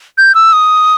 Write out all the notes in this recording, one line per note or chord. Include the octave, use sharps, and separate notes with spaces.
G6
E6
D#6